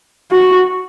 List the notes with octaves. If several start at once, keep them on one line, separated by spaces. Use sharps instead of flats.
F#4